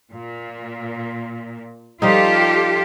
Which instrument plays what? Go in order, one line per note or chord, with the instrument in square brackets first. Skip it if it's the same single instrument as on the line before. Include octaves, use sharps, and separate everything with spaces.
[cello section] A#2
[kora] F3 G3 D#4 [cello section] F4 G4 A4